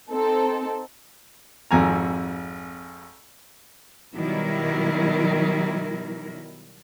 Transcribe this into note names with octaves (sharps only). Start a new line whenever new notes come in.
C4 D#4 A4
G#1 F2 G#5 A#5
B2 D#3 F#3 G3 E4 A#4